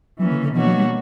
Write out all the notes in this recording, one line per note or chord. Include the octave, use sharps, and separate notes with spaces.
E3 F#3 A#3 C#4
D3
D3
B2 E3 A#3 D4 F#4 C#5
F#3
G3